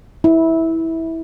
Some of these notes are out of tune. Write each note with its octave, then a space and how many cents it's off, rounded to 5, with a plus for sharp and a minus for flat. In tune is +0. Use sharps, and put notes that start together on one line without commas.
E4 -15